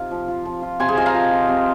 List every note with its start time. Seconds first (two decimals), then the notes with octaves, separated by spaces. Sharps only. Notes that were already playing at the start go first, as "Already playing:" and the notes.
Already playing: C3 D#4 F4 F5
0.11 F3
0.28 F4
0.45 F3
0.62 F4
0.80 C3 G#5 C6
0.88 G#4 C5
0.97 F4 D#5 G#5
1.06 F5 A#5
1.14 F3
1.31 F4
1.49 C3